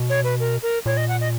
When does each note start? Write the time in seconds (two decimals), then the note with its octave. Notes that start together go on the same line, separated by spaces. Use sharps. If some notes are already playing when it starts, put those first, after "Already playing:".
Already playing: B2
0.10 C#5
0.24 B4
0.40 A#4
0.63 A#4
0.86 A#2 C#5
0.97 D#5
1.08 F#5
1.21 D#5